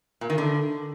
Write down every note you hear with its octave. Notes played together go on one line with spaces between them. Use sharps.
A#2
D#3
D3